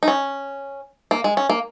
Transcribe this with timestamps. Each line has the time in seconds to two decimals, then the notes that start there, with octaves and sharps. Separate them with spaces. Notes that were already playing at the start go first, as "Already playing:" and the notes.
0.03 D#4
0.08 C#4
1.11 A#3
1.24 G#3
1.37 C#4
1.50 A#3